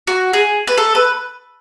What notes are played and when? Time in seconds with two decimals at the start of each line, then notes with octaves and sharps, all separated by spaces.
0.07 F#4
0.33 G#4
0.67 B4
0.78 A4
0.95 B4